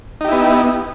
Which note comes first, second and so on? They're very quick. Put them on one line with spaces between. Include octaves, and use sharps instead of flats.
D#4 G4 E4 B3